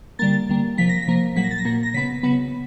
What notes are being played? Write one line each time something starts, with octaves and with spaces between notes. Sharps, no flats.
D3 G3 A#3 A6
D3 G3 A#3
C3 F3 A#3 B6
A#6
B6
C3 F3 A#3
A#2 F#3 A#3 B6
A#6
A6
A#6
A#2 F#3 A#3
A#6
C#3 F#3 B3 B6
C#3 F#3 B3